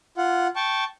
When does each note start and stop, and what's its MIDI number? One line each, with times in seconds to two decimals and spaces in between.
0.17 0.48 65
0.17 0.48 78
0.56 0.84 79
0.56 0.84 81
0.56 0.84 85